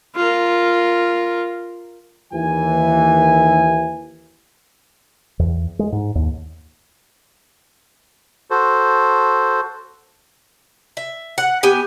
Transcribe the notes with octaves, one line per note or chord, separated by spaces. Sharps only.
F4 A#4
D#2 E3 G#5
E2
G#3
G#2
D#2
F#4 A4 C5
E5
F#5
B3 G4 G#5